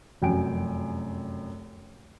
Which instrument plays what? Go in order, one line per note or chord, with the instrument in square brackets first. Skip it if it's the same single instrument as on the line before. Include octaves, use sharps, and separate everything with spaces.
[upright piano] F1 F#2 G5 G#5 D7